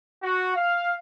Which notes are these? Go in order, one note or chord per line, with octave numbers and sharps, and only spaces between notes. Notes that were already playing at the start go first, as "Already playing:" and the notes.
F#4
F5